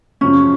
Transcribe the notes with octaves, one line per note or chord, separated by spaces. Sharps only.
F#2 C#3 F3 C#4